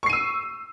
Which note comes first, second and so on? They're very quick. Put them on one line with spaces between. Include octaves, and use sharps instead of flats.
C#6 C7 D#7 E6